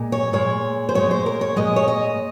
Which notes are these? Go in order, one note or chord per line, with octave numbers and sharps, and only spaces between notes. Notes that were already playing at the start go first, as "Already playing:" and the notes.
Already playing: A#2 G#3
C#5
A#2 G#3 C#5
C5
A#2 G#3 C#5
C5
A#4
C#5
A#2 G#3 D#5
C#5
D#5